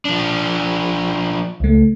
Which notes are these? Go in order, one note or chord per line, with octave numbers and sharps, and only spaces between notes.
F3 D4
C#2 A3